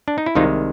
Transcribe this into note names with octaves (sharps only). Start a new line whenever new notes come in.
D4
D#4
E4
C2 C3 D#3 G#3 D#4 F4